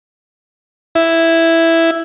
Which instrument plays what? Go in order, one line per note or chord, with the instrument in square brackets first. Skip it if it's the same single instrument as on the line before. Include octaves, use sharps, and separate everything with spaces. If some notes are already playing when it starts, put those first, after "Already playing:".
[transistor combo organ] E4